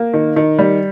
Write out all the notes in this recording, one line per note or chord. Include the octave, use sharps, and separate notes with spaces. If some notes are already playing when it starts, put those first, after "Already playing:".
Already playing: A#3
D#3
D#3
G3